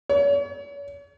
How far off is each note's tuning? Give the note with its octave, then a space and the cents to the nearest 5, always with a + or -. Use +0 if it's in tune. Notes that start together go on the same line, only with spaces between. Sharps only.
C#5 +40